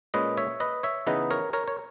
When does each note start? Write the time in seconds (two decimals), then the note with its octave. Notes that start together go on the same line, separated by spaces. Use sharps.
0.14 A#2 G#3 C#4 B4 D#5
0.37 C#5 E5
0.60 B4 D#5
0.83 C#5 E5
1.07 C#3 E3 B3 D#4 B4 D#5
1.31 A#4 C#5
1.53 A#4 C#5
1.68 C#5